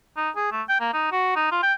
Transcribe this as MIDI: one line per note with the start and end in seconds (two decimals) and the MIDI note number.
0.17 0.30 63
0.36 0.50 68
0.51 0.62 57
0.69 0.78 79
0.81 0.92 58
0.93 1.10 63
1.12 1.31 66
1.36 1.48 63
1.51 1.58 65
1.63 1.74 79